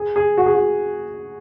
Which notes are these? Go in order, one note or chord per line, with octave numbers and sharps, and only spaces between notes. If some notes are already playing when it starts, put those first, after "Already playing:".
Already playing: G#4
G#4
F#4
G#4
F#4